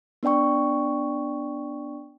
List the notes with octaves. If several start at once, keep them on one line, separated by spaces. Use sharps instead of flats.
B3 D4 D5 G5 C#6